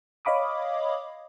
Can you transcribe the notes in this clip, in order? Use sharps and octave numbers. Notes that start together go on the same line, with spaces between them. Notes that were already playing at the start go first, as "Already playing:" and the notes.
C#5 D#5 F5 B5 D6 D#6